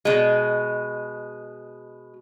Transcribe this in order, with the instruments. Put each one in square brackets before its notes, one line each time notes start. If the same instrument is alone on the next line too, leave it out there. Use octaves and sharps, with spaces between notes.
[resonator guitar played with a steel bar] B2 G#3